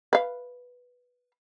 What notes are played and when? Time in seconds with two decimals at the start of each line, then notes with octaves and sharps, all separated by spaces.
0.13 B4 F5